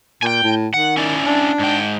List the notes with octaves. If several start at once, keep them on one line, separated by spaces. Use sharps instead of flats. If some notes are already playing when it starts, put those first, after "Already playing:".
A#2 G5 G#5
A2
D#3 F#5
C#4 E4 D5
D4
G#2 G5